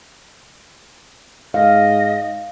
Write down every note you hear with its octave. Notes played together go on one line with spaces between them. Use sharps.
G#2 D#5 F5